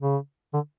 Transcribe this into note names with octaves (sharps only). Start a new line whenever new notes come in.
C#3
D3